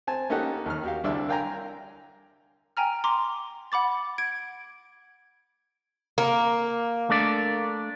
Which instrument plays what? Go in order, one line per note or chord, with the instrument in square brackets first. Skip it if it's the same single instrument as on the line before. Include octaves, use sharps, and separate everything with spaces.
[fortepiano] C4 G#5 A5
A#3 C#4 D#4 G4 A4 F#5
D#2 D#3 F6
F#4 G4 F5
C2 D3 D4 D5 E5 E6
A#4 F5 G5 G#5 A#5
[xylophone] G5 G#5 A#5 F6
A#5 C6 D6
F#5 B5 D6 A6
G#6 D7
[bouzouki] A#3
[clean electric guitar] A3 D4 D5